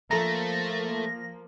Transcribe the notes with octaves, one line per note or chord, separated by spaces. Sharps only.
F3 A3 A#3 A4 A#5 A#6